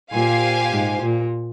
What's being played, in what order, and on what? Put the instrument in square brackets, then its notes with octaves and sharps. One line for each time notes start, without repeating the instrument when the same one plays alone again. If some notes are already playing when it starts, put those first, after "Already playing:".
[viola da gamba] A#2 [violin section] G4 C5 F5 G#5
[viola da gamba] G#2
A#2